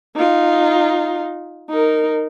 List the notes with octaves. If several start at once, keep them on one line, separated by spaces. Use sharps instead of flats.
D#4 F4
D#4 A#4